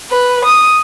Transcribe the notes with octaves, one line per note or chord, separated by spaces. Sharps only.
B4
D#6